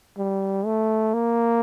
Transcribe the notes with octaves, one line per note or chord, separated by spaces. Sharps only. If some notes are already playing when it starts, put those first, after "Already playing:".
G3
A3
A#3